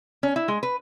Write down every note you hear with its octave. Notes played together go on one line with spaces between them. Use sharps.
C#4
E4
G#3
B4